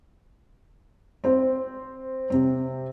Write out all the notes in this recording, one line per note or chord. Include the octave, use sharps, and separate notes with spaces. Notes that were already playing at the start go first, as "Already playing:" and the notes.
C4 C5
C3 C4